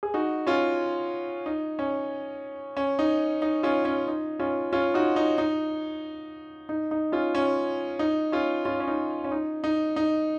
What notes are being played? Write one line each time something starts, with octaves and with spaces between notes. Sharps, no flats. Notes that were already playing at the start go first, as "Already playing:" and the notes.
G#4
D#4 F#4
C#4 F4
D#4
C#4
C#4
D#4
D#4
C#4 F4
C#4
D#4
C#4 F4
C#4 F4
D#4 F#4
D#4
D#4
D#4
D#4
C#4 F4
C#4
D#4
C#4 F4
C#4 F4
C#4
D#4
C#4
D#4
D#4
D#4